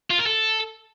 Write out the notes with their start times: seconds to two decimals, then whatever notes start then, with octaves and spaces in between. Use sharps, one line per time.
0.10 F4
0.18 A#4
0.26 A4